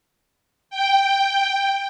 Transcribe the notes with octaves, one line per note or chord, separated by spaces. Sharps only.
G5